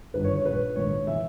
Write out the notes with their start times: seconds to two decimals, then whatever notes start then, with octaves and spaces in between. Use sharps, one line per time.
0.14 G1 G2 D#3 B4
0.24 C#5
0.35 C#5
0.45 A#1 A#2 B4
0.76 A#1 G#2 D#3 C#5
1.07 E3 E5